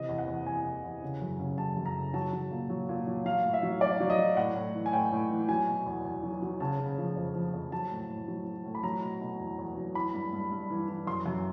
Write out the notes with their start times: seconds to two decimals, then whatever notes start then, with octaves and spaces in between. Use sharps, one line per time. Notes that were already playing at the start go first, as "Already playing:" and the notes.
Already playing: C3 E3 D#5
0.09 E2
0.18 F#5
0.27 E2
0.46 E2 G#5
0.65 E2
0.84 E2
1.02 C#3
1.21 F#2
1.39 C#3
1.58 F#2 A5
1.77 F#2
1.85 A#5
1.95 C#3
2.14 F#3 A5
2.33 F#3
2.51 A#2
2.70 F#3
2.89 A#2
3.07 F#3
3.25 F#3 F5
3.44 A2
3.54 E5
3.63 F#3
3.81 F#3 D5
4.00 F#3
4.10 D#5
4.18 F#3
4.37 A2 F#5
4.56 A2
4.75 E3
4.86 G#5
4.93 A2 G5
5.12 A2
5.30 E3
5.48 F#3 G#5
5.67 B2
5.86 E2
6.05 E2
6.23 F#3
6.42 F#3
6.60 C#3 A5
6.80 C#3
6.98 F3
7.16 F2
7.35 F3
7.54 F2
7.72 F#3 A5
7.91 A2
8.09 A2
8.28 F#3
8.47 F#3
8.65 A2
8.75 B5
8.83 F#3 A#5
9.02 B2
9.21 B2
9.40 E2
9.59 E2
9.77 F#3
9.95 E3 B5
10.14 G2
10.33 G2
10.51 G2
10.70 E3
10.88 E3
11.07 F#2 C6
11.26 F#2